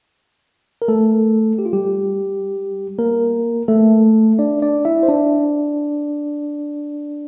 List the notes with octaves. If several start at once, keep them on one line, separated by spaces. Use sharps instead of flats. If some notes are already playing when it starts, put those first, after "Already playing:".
A#4
A3 A4
G4
F4
G3 G4
A#3 A#4
A3 A4
D4 D5
D4 D5
E4 E5
C5
D4 D5